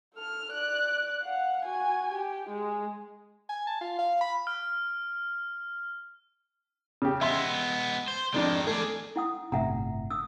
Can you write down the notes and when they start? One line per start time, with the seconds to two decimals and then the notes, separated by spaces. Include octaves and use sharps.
0.15 A4 F6
0.52 D5 F#6
1.22 F5 F#5
1.65 F#4 G#5
2.13 G4
2.50 G#3
3.49 G#5
3.67 A5
3.81 F4
3.99 F5
4.21 B5
4.47 F6
7.02 C#3 G4
7.21 G#3 B3 E5 C6
8.08 C5
8.34 F2 D#3 G#3 D4
8.67 A3 G#4 D5
9.16 E4 F#5 D#6
9.52 G1 A2 C3 E5 F#5 A#5
10.11 D#6 E6